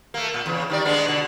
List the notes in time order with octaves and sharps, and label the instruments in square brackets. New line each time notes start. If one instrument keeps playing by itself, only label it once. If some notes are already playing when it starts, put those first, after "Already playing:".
[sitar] A3 A#3
A#2
E2 C#3
D#3 G3 D5
G#3 B3 D4
B2 D3